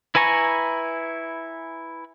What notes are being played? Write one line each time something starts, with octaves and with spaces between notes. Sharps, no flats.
E4 B4 G#5 A#5 C#6